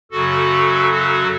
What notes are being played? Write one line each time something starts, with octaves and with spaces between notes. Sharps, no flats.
F#2 C#3 F#3 F#4 A4
F#4 A4